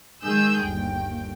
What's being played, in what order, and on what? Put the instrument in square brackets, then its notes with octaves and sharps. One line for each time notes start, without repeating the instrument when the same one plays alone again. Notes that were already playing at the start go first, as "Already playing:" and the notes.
[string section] D#3 G#3 G#4 E6 G6
G1 D#2 G5